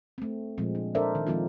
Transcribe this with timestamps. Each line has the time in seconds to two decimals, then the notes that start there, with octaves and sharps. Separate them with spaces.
0.18 A3 C4
0.58 A#2 F3 G#3 C4
0.75 D4
0.95 D4 A4 A#4 C5 D5 E5
1.15 D#3
1.27 D#3 F3 G#3 C4 D#4 F4